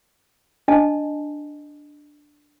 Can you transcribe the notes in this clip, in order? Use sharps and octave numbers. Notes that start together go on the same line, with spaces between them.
D4 D#5 G#5 A5